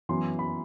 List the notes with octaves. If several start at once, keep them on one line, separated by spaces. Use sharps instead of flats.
F#2 E3 B3 C6
B5